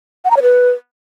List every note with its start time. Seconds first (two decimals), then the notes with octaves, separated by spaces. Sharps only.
0.25 F#5
0.31 A#5
0.37 C#5
0.42 B4